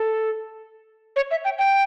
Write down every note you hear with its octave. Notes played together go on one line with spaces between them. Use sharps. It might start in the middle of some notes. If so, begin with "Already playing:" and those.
Already playing: A4
C#5
E5
G5
G5